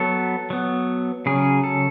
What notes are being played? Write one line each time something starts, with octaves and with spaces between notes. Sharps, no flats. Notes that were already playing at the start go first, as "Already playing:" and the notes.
Already playing: F#3 B3 A4
F#3 B3
C#3 F#3 C#4 G#4
A4